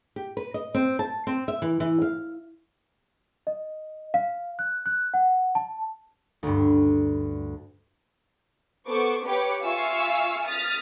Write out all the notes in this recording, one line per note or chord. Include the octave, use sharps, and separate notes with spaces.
G4
B4
D#5
C4
A5
C4
E5
E3
E3
F5
D#5
F5
F#6
F#6
F#5
A5
D2 G2
B3 A4 C5 C#6 D6
G4 B4 C#5 D6 C#7
F4 E5 F5 G#5 C#6 E6
D#6 F6 A6 B6